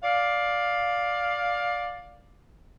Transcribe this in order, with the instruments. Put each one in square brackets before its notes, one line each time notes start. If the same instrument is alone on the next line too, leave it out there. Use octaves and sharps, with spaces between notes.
[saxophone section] D5 F5